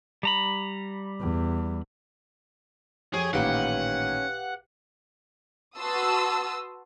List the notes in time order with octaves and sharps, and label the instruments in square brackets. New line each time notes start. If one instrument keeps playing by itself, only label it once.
[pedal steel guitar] G3 A#5 B5
[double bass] E2
[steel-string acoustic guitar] F2 G4 [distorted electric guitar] G#4 [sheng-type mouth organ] C#5
[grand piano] A1 A#2 D#3 [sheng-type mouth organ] C#4 [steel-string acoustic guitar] G4 B4 F5 [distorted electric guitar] F#5
[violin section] F#4 B4 A5 C6 D#6 E6